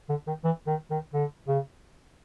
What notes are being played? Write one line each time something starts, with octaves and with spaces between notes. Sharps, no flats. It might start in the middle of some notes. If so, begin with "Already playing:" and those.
D3
D#3
E3
D#3
D#3
D3
C#3